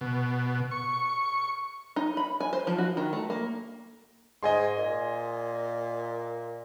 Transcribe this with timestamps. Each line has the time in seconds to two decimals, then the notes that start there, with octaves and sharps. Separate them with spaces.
0.01 B2
0.71 C#6
1.96 D#4
2.17 B5
2.40 G#5
2.53 C5
2.67 F3
2.78 F#4
2.97 D#3
3.13 A3
3.30 A#3
4.43 G#2 D#5 G#5 C6
4.77 A#2